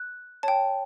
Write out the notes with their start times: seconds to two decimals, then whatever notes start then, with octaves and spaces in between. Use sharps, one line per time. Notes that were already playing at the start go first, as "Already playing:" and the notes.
Already playing: F#6
0.43 C#5 G5 A5